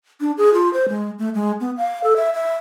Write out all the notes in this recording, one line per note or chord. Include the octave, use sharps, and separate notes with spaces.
D4
G#4
F4
C5
G#3
A3
G#3
B3
F5
A4
E5
E5